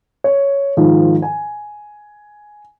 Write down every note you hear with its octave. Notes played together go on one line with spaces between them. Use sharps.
C#5
G#2 D#3 F3
G#5